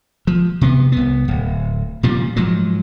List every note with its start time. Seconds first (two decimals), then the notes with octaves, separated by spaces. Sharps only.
0.27 F3
0.61 C3 B3
0.92 C2 B3
1.28 D1
2.03 A#2 C#3 F3 G3
2.36 G#2 F3 F#3